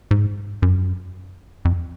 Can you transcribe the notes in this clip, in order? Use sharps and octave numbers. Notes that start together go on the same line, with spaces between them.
G#2
F#2
F2